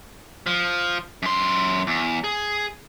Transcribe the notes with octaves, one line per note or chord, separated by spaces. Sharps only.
F3
F#2 C6
E2
G#4